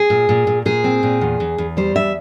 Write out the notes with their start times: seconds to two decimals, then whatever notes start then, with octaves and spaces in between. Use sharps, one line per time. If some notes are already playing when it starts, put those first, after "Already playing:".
Already playing: G#4
0.10 A#2
0.29 A#2
0.47 A#2
0.65 A#2 G#4
0.84 C4
1.03 A#2
1.21 E2
1.40 E2
1.58 E2
1.77 G3 C5
1.95 E2 E5